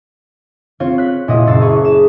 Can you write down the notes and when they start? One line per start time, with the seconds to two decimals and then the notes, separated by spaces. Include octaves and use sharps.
0.80 C4 F4 C#5 C#6
0.98 F#6 B6
1.28 A#2 E4 F#4 D#5
1.47 F#1 E6 A6 C7
1.61 G#4 C#6
1.85 E7